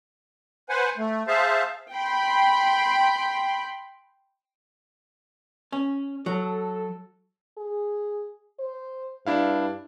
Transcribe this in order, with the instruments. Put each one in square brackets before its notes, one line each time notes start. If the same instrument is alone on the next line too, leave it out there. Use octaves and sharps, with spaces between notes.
[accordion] B4 C5 F#5 G#5
A3
G#4 C5 E5 F5 A5
[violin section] G5 B5 C6
[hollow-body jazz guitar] C#4
[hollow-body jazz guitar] F#3 [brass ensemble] A4
[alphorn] G#4
C5
[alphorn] G2 [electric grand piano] D4 E4 F5